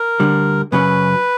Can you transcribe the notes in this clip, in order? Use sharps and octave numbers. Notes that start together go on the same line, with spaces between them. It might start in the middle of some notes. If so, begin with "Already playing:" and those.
Already playing: A#4
D2 D3 G3
F#2 C#3 F#3 C#4 B4